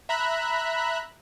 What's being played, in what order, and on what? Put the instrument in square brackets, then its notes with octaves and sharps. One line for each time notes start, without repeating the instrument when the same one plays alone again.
[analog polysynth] E5 A#5 B5 F#6